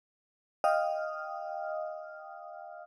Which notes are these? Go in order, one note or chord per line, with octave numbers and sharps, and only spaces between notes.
D#5 F5 G5 D#6 F6